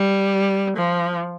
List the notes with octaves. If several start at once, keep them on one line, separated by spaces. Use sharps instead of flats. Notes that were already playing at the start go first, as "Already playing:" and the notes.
Already playing: G3
F3